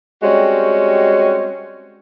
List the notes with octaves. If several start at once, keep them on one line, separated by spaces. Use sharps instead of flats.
G3 G#3 C4 C#4 F#4